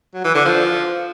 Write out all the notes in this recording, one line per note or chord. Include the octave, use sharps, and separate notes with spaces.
F#3
E3
D3
F3